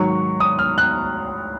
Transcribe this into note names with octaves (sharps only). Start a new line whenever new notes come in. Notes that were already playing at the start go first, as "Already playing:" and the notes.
Already playing: G#2 D#3 F#3 C#6
D#6
F6
F#6